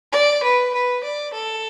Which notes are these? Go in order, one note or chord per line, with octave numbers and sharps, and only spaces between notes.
D5
B4
B4
D5
A4